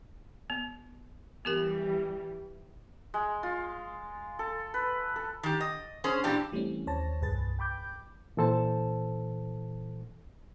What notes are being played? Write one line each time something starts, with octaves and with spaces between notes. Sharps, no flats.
B3
E3 G3 B3 G4 A#4
G#3
F4
A4
B4
A4
D#3 G4
D#5
C#4 G#4 C5
A#2 E3 D4 G4
E3 G3 A3 C4 C#4
D#2 C5 C#5 A5 A#6
C2 G2 G#4 B4 A6
G5 B5 D6 G6
A#2 E3 A4 C5 A5